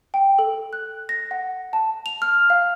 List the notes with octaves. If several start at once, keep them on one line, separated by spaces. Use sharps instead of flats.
G5
A4
F#6
A#6
F#5
A5
F7
F6
F5